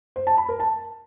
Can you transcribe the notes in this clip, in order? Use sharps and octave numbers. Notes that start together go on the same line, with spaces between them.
C5
A5
B5
A#4
A5